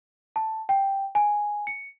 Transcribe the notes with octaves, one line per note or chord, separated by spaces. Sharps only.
A5
G5
G#5
C#7